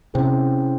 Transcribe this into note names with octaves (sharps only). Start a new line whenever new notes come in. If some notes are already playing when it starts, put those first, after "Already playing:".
C3 C#4 E4 G#4 C5 G5